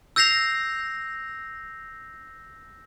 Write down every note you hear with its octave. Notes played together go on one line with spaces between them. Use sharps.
E6 G6 A#6 C7 F7